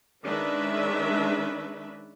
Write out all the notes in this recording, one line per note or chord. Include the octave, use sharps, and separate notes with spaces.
D#3 G#3 C#4 D4 B4 E5